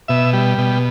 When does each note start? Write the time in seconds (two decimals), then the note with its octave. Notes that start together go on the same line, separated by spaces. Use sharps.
0.08 B2 E5
0.33 G3
0.58 B2